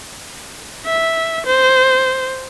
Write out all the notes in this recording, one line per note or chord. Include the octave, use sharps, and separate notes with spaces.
E5
C5